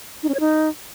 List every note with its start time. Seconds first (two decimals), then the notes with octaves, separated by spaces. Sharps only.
0.23 D#4
0.29 C#4
0.34 C#5
0.40 D#4